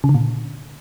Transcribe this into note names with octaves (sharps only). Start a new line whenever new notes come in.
C#3
D3
A#2